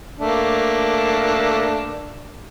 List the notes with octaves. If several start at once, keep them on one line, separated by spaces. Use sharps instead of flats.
A3 A#3 D4